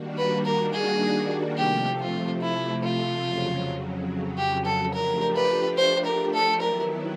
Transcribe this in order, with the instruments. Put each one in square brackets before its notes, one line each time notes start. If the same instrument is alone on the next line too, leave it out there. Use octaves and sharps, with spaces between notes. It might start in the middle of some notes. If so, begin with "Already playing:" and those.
Already playing: [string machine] D#3 G3 A#3 D4 F#4
[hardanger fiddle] B4
A#4
G#4
[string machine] C3 F3 A3 [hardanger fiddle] G4
[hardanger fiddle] F4
E4
F4
[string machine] F2 C#3 F#3
[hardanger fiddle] G4
A4
[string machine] F3 A3 D4 G4 [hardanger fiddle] A#4
[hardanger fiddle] B4
C5
A#4
A4
[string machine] D#3 F#3 B3 E4 [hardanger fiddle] A#4